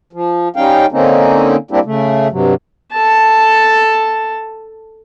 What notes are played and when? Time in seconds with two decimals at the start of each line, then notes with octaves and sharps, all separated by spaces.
0.13 F3
0.56 G3 C#4 D#4 F5 G5
0.92 D3 A#3 C4 C#4 D#4
1.71 G3 A#3 C4 D4 E4 G4
1.85 C#3 A3
2.31 G2 C3 F#3
2.93 A4 A5